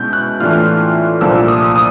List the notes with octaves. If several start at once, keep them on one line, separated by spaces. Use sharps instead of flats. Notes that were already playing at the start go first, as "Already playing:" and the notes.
Already playing: B2 G#3 C#4 E4 G6
F#6
A2 E3 A3 D4 F4 F6
C2 A#2 F3 A#3 D4 E6
D#6
D#6